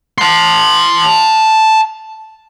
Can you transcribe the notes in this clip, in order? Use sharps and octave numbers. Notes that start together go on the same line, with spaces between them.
A5 C6